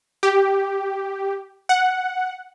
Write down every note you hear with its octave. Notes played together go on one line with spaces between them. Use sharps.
G4
F#5